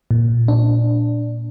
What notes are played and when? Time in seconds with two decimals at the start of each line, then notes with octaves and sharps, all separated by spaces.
0.11 A#2
0.48 D4